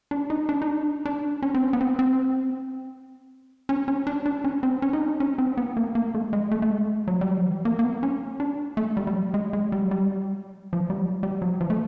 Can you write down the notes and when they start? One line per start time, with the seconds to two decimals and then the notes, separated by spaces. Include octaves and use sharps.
0.11 D4
0.30 D#4
0.49 D4
0.62 D#4
0.68 D4
1.05 D4
1.42 C#4
1.55 C4
1.62 C#4
1.73 B3
1.81 C4
1.99 C4
3.69 C#4
3.88 C#4
4.07 D4
4.26 D4
4.44 C#4
4.63 C4
4.82 C#4
4.93 D#4
5.01 D4
5.20 C#4
5.38 C4
5.57 B3
5.77 A#3
5.95 A#3
6.15 A3
6.33 G#3
6.51 A3
6.62 A3
6.70 G#3
7.08 F#3
7.21 G3
7.30 F#3
7.38 F3
7.46 E3
7.65 A#3
7.79 A#3
7.84 B3
8.03 C#4
8.40 D4
8.77 A3
8.97 G3
9.07 G3
9.15 F#3
9.34 G#3
9.53 G#3
9.72 G3
9.81 F#3
9.91 G3
10.73 F3
10.90 G3
10.98 F#3
11.23 G3
11.42 F#3
11.61 F3
11.70 A3